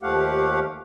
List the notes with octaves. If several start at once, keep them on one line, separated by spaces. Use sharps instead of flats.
D#2 F3 A3 G4 F5 F#5